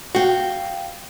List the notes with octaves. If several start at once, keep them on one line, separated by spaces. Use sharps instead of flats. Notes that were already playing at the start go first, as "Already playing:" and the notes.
F#4 F5 G5